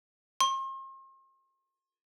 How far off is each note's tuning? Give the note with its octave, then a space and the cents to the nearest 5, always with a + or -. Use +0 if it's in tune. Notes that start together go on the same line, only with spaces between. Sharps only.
C6 +40